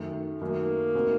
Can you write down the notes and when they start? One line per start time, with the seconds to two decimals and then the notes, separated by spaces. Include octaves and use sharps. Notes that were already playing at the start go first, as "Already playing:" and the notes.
Already playing: F#2 D#3 A3
0.41 F#2 D#3 F#3 A3 A#3
0.95 C#3 A3 C4 D#4 F#4